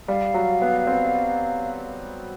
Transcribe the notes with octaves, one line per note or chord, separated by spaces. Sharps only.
G3 F5
F#3
B3
C4